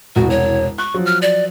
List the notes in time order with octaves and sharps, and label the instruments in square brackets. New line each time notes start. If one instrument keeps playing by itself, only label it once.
[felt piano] E1 C2 [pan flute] F#4
[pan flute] C#5
[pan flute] C#6 [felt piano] F#6
[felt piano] F3 F#3
[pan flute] F6
D5